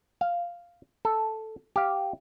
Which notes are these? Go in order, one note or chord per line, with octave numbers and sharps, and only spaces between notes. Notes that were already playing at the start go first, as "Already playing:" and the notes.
F5
A4
G4 F5